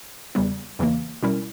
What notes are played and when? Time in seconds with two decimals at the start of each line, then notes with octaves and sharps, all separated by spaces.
0.35 E2 C#3 G3 B3
0.79 E2 C#3 E3 A#3
1.23 B2 G3 C#4 E4 A#4